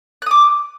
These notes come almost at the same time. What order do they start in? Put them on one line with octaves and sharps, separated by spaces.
F#6 D#6 D6